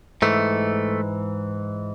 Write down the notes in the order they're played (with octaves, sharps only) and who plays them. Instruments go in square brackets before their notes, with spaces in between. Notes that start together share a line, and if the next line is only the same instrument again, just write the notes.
[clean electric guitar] G#2 E3 A3